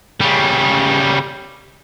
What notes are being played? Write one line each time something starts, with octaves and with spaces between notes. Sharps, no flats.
C#3 G3